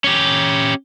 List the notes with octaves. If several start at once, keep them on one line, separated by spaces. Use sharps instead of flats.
C#4 G4